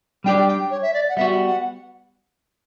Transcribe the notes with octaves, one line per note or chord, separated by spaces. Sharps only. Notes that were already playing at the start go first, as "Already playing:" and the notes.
G3 D4 G4 D5 G5
G5
C#5
E5
D5
F#5
G3 B3 F#4 E5
F#5